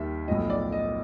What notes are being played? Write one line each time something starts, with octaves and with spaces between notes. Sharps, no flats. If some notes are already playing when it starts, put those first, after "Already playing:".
Already playing: D#2 D#3 G3 E5
B1 A2 F3 D#5
D5
D#5